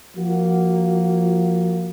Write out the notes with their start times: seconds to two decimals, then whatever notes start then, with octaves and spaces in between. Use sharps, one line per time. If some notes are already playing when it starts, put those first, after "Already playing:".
0.17 F3 A#3 F#4